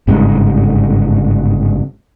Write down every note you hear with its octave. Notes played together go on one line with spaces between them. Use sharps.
G1 G#2 C#3